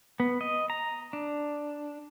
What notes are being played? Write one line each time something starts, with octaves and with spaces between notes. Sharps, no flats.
B3
D#5
A#5
D4